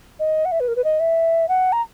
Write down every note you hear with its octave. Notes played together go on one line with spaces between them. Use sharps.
D#5
F#5
E5
B4
A#4
B4
D#5
E5
F#5
A#5